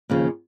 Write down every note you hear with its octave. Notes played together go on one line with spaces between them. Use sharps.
D#2 C#3 F3